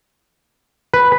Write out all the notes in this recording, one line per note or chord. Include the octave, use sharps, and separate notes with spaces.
B4